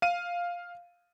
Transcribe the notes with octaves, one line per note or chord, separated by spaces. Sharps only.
F5 D#7